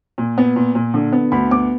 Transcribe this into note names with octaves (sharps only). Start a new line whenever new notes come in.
A#2
B3
A#2
A#2
D3
B3
D2 B5
B3 D6